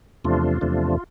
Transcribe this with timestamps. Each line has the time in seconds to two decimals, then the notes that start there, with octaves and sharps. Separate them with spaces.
0.25 E2 C3 F3 A3 D4 F4
0.61 E2 C3 F3 A3 D4